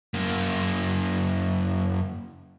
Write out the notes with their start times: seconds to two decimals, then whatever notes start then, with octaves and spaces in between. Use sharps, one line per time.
0.14 F#2 A#3